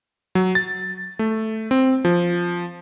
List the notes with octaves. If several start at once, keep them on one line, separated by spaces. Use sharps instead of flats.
F#3
A6
A3
C4
F3